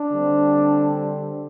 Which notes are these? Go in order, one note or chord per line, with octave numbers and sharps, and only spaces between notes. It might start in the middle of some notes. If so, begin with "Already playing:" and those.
Already playing: D4
D3 G3 C4